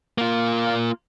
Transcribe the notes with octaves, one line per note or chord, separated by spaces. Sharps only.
A#3 F4